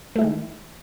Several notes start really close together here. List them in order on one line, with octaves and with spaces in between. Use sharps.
A3 E4 G#3 D#3